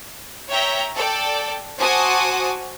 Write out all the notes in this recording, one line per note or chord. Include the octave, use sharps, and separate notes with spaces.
C#5 E5 G5 A#5
A4 D5 G5
F#4 C5 G#5 A5 D6 D#6